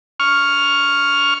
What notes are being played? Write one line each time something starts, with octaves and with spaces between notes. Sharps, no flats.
C#6 F6